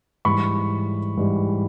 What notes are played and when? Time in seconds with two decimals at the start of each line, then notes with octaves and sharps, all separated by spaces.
0.25 G#2 E3 G3 B5 C#6
1.17 G#2 E3 G3